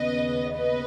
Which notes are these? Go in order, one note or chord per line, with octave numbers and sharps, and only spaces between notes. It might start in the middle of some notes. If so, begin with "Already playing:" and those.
Already playing: D#2 C#3 B3 B4 D#5
B4 D#5